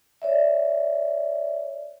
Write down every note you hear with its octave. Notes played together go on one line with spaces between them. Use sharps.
C#5 D5 E5